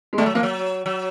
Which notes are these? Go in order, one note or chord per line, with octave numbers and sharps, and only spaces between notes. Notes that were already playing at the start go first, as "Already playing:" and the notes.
G#3
G3 A3
F#3
F3 A#3
F#3
F#3